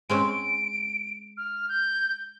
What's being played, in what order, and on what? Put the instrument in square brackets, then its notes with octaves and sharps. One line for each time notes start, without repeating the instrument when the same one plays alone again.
[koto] G#3 C4 C#4 [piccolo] D7
[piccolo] F6
G6